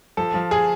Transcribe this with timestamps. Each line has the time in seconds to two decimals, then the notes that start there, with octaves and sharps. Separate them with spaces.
0.17 F3 A4
0.34 F3
0.51 G#4